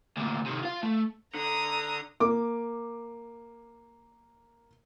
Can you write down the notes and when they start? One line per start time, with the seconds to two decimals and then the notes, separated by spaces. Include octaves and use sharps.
0.17 D2 A#2
0.46 C3 D#3
0.63 F4 F5
0.83 A3
1.34 D3 A#5 D#6
2.20 A#3 D6